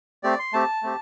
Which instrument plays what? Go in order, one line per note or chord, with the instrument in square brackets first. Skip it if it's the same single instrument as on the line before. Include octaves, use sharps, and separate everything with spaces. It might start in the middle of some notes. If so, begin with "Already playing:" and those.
[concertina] A3 C4 G4 D5
C6
A3 C4 G4 A5
A3 C4 G4